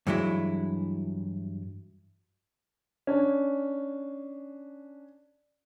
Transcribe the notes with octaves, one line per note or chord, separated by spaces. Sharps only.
G2 E3 F#3 G#3 E4
C#4 D4